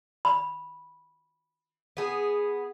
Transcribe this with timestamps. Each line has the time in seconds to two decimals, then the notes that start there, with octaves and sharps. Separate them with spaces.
0.25 B5
1.97 B3 G#4